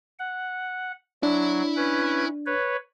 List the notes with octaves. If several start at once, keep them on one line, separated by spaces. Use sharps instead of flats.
F#5
F#3 D4 E4
C#4 B4
B4 C#5